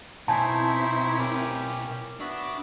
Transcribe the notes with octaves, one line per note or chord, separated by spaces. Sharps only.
B2 C4 D#4 E4 C5 C#5 G#5 A5
B2 C#4 G4 A#4
B3 D4 F#4 E5